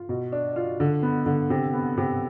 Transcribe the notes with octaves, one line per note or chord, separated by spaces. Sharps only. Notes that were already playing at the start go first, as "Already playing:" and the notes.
Already playing: F4
B2
D4
F4
D3
B3
D3
C3
B3
C3